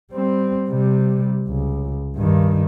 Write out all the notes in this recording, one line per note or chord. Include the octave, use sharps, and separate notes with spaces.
G3 C4
C3 G3
C#2
G2 D#3